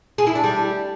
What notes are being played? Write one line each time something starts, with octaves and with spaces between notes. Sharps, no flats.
G#4
E4
D4
G3